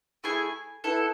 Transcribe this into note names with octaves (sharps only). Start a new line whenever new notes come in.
A3 E4 G#4 G#5
B3 E4 A4